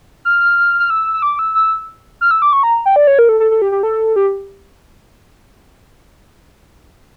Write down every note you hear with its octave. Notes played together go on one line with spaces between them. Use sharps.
F6
F6
E6
E6
D6
E6
E6
F6
E6
D6
C#6
A#5
G5
D5
C#5
A#4
A4
A4
A4
G4
G4
A4
G4